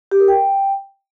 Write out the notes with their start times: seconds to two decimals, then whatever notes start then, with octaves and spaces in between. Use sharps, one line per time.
0.11 G4
0.20 A#4
0.28 G5